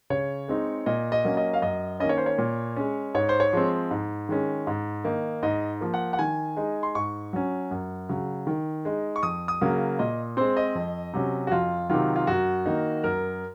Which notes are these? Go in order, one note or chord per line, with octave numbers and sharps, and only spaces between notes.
C#3 C#5
G#3 C4 D#4
A#2 D#5
D#5
F#3 A#3 C#4
D#5
F5
F#2 D#5
D#3 A#3 C#4 D#5
C#5
C5
C#5
A#2
G#3 C#4
G#2 C#5
C5
C#5
F3 G#3 C4
G#2
D#3 G#3 C#4
G#2
D#3 A#3 D#4
G#2 D#5
F3 A#3
F#5
F#5
D#3 G#5
G#3 D#4
C6
G#2 C#6
F#3 C#4
F#2
C#3 F#3
D#3
G#3 D#4
C#6
F2 D#6
D#6
C#3 F#3 A#3
A#2 D#5
G#3 C4 C5
D#5
F2
C3 F#3 C#4
F#4
F2 F4
C3 D#3 F#3 F4
F4
F#2 F#4
D#3 A#3 D#4
F#2 A#4